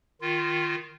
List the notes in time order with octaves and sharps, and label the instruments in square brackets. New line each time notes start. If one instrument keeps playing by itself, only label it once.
[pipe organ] D#3 F4